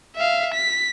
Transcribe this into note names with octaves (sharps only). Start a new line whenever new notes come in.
E5 F5
B6